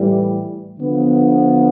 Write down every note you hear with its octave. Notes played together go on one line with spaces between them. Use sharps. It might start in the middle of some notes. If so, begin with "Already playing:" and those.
Already playing: A2 E3 G3
D3 F3 B3